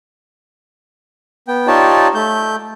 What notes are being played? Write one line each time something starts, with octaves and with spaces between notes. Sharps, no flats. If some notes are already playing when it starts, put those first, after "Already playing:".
B3 G5
D#4 F4 G4 C#5 D5 A5
A3 G6